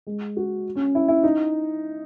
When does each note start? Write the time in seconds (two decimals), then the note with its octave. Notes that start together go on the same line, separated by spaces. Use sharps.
0.07 G#3
0.37 F#4
0.75 C#4
0.95 E4
1.08 E4
1.23 D#4